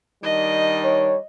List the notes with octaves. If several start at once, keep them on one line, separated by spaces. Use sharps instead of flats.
D#3 G3 D4 D#5
C#5